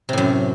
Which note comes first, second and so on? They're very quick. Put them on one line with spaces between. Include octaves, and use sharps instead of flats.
C3 A2 F#2